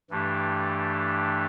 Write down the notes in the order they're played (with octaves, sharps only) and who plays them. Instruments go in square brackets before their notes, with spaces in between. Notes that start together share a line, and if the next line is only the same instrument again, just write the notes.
[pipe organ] G2 E3 A3 D4 G4